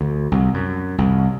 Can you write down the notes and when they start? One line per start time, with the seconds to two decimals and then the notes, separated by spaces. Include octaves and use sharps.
0.01 D2
0.32 C2
0.54 F#2
0.98 C2